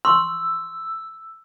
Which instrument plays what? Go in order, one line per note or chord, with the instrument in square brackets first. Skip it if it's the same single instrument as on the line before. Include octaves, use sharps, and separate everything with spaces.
[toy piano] C6 C#6 [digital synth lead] E6